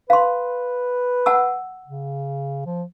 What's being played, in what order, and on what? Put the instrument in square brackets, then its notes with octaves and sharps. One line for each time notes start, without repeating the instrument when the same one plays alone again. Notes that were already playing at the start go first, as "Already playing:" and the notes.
[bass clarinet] B4 [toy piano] F5 C6
[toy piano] F#5 A5 E6
[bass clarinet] C#3
F3